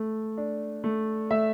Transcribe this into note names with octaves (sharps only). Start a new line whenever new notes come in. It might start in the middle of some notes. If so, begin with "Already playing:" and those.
Already playing: A3
D4
A3
A3 E5